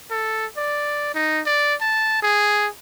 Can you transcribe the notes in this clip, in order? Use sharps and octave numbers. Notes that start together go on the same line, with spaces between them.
A4
D5
D#4
D5
A5
G#4